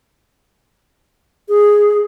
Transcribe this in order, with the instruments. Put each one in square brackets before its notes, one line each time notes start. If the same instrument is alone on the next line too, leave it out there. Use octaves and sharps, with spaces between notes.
[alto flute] G#4